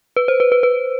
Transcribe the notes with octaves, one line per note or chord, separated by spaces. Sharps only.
B4
C5
B4
B4
B4